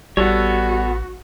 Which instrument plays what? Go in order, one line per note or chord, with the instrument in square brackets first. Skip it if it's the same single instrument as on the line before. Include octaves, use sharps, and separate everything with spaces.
[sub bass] A1 [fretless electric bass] G3 [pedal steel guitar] B3 A4 C#5 [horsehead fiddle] F#4